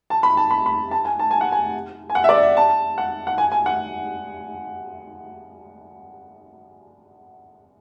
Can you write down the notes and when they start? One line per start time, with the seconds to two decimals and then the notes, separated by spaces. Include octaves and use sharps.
0.10 A5
0.23 B5
0.37 A5
0.51 B5
0.66 B5
0.91 A5
1.05 G#5
1.19 A5
1.31 G#5
1.41 F#5
1.52 G#5
2.10 G#5
2.15 F#5
2.24 E5
2.29 D5
2.43 E5
2.57 A5
2.98 F#5
3.27 F#5
3.38 G#5
3.52 G#5
3.66 F#5